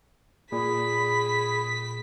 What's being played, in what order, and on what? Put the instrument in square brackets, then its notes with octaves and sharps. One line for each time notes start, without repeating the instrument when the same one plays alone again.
[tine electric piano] A#2 [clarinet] G#4 [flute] B5 [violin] B6